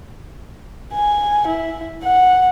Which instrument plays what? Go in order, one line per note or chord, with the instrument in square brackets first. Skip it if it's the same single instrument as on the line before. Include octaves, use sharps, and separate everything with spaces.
[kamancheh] G#5
E4
F#5